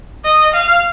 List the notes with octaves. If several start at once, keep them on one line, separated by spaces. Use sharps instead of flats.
D#5
F5